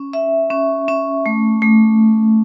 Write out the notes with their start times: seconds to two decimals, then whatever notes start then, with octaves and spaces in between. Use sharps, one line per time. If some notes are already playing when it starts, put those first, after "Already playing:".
Already playing: C#4
0.13 E5
0.50 C#4
0.88 C#4
1.26 A3
1.62 A3